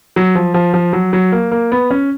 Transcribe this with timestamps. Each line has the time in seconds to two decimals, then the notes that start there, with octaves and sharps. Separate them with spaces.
0.16 F#3
0.35 F3
0.54 F3
0.74 F3
0.93 F#3
1.13 F#3
1.32 A#3
1.51 A#3
1.72 B3
1.90 C#4